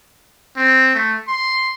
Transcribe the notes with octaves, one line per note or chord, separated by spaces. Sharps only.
C4
A3
C6